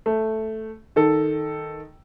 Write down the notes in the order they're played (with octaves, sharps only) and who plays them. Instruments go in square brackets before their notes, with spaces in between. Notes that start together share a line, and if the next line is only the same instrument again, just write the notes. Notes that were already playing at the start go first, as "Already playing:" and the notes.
[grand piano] A3
D#3 A4